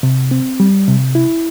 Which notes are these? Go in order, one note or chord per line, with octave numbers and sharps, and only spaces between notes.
C3
C4
G3
C3
E4